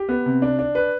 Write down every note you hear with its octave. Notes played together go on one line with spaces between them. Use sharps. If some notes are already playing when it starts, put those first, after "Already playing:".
Already playing: G4
B3
C3
D4
D4
B4